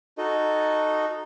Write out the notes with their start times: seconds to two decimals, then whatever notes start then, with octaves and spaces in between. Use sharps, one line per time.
0.18 D#4 F#4 A4 D#5